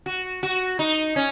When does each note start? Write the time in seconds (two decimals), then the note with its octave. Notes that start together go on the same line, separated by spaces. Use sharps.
0.06 F#4
0.43 F#4
0.79 D#4
1.16 C#4